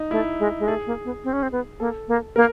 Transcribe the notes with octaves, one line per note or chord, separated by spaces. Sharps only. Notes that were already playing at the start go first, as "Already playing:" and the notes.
Already playing: D#4
A3 E4
G#3
G#3
A3 G#4
A#3
B3
C4
C#4
C4
B3
A#3 A4
A#3
A#3 A#4